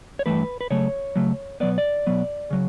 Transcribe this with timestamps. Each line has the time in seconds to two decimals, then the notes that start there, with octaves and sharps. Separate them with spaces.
0.19 C#5
0.26 G2 E3 A3 B4
0.61 B4
0.70 C#3 F#3 A3 C#5
1.15 C#3 F#3 A3
1.60 B2 F#3 B3 D5
1.78 D5
2.06 B2 F#3 B3
2.50 C#3 F#3